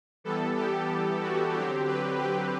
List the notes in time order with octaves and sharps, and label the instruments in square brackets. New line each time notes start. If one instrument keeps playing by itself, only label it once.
[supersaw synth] E3 G3 B3 A4
G4
F#4
D3 F#3 C4 G4
B4
G4